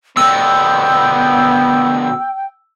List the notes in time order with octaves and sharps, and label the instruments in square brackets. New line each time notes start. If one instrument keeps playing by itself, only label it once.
[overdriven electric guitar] B2 D3 [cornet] B3 [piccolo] G5 [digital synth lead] E6